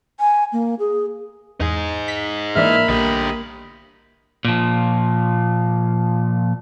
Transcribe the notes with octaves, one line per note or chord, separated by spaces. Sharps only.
G#5
A#3
G#4
E2 D#4 G#4
B6
G#2 E3 A#3 D4 E5 B5 F6
A#1 D3 G4 D#5
A#2 F3